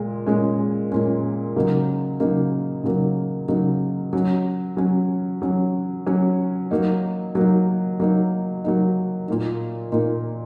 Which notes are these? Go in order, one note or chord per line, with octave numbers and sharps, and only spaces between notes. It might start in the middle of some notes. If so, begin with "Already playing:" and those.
Already playing: A#2 G#3
A#2 G#3 C#4
A#2 G#3 C#4
C#3 F#3 A#3 D#4
C#3 F#3 A#3 D#4
C#3 F#3 A#3 D#4
C#3 F#3 A#3 D#4
F#3 C#4
F#3 C#4
F#3 C#4
F#3 C#4
F#3 A#3 D#4
F#3 A#3 D#4
F#3 A#3 D#4
F#3 A#3 D#4
A#2 A#3 D#4
A#2 A#3 D#4